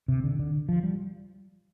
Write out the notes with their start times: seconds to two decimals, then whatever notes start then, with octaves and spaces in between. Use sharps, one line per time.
0.08 C3
0.24 D3
0.39 D3
0.69 F3
0.83 G3